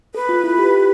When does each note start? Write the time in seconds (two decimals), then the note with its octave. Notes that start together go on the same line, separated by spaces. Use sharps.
0.15 A4 B4
0.29 F4
0.44 E4
0.59 G4